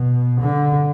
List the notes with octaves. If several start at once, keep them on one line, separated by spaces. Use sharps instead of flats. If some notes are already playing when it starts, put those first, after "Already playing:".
Already playing: B2
D3